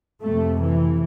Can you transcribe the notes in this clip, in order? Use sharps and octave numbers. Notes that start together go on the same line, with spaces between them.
F2 C3 A3
E3